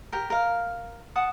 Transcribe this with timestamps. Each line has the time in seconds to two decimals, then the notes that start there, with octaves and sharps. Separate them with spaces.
0.13 G4 A#4
0.30 A#4 F5
1.16 F#5 A5 D#6